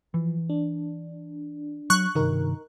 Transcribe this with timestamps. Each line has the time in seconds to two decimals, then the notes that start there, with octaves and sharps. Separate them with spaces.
0.14 E3 F3
0.50 D4
1.90 F#3 C#6 F#6
2.15 G2 C3 D#3 D#4 A#4